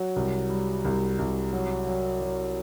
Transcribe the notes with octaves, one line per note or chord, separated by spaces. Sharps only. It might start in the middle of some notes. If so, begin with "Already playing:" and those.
Already playing: F#3
C2
G3
C2
C2
F#3
F#3
F#3